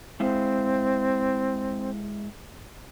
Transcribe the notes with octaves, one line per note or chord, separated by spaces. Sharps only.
G#3 C4 E4 F5